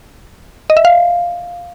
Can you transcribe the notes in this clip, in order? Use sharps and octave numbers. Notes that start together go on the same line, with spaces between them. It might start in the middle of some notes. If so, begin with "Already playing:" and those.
D#5
E5
F5